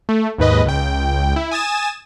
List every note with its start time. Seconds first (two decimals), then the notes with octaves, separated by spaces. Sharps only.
0.09 A3
0.38 D#2 G#2 B4 D#5
0.65 C#2 G5
1.36 E4
1.51 G#5 D#6 A6 E7